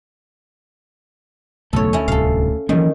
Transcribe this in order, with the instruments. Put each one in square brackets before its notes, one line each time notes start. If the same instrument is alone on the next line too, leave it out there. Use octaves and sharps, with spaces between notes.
[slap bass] F#1 B1 G#2 [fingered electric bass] A3 [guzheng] A4 C#5
[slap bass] D2 [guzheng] C#4 E4
[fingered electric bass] D1 C2 [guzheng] A4 F5
[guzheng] D#3 [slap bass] E3 F#3 A#3 [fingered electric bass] C#4